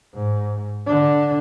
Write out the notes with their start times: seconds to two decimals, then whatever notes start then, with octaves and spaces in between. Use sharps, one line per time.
0.14 G#2
0.87 D3 D4